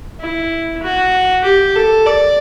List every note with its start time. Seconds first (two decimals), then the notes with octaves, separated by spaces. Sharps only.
0.20 E4
0.83 F#4
1.44 G4
1.75 A4
2.06 D5